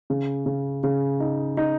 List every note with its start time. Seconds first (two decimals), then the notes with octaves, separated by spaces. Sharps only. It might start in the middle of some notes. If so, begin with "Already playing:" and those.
0.10 C#3
0.46 C#3
0.83 C#3
1.20 D#4
1.57 D#4